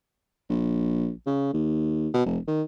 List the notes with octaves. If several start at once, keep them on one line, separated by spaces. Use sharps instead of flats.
A#1
C#3
D#2
B2
F1
D#3